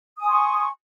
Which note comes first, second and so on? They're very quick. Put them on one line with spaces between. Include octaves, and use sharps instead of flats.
D#6 G#5 C6 C#6